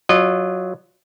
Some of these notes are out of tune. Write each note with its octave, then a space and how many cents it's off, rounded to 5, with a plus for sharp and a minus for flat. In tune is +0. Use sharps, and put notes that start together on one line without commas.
F#3 +0 F4 +0 D#5 -30